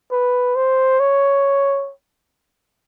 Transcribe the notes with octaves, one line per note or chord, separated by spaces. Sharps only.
B4
C5
C#5